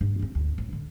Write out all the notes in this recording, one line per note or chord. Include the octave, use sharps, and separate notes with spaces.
G2
C#3 C4
D2
A1
D3